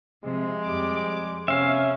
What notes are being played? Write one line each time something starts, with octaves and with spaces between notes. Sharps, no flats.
C3 F3 G#3
F2 G3 D6
C3 B3 C#4 E5 F5